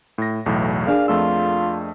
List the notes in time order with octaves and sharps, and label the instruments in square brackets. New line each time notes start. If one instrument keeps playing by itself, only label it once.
[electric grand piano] A2 A#6
B1 E2 A2
[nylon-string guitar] A#3 D4 G#4 [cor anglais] F5
[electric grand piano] F2 A3 E6 [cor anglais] F4